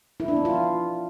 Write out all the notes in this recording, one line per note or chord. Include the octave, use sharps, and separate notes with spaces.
E4
D4
B3
F4